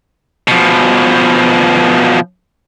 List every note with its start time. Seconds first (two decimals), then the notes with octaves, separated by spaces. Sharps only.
0.48 B2 F3